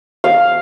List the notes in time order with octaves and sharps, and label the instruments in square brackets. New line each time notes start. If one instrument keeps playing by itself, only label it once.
[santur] F5